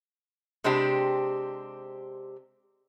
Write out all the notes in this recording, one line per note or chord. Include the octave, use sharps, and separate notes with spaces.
C3 G#3 C4 D4 G4